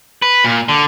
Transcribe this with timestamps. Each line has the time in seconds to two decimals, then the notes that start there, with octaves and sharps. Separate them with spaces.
0.22 B4
0.44 A#2
0.69 D3